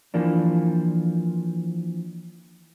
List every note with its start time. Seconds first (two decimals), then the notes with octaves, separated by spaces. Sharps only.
0.14 E3 F3 A#3 D4